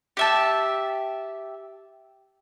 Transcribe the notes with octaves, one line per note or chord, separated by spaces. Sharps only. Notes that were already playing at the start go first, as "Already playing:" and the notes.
G4 E5 A5